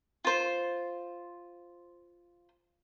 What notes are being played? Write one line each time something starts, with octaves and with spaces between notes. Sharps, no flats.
F4 C5